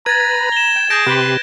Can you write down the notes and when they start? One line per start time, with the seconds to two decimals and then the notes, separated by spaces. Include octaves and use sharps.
0.06 B4 A#5 B5 G#6 A6
0.52 E7 G7
0.76 G5
0.90 G#4 A5 G6 A#6 D7
1.07 C3 G4 B4 C6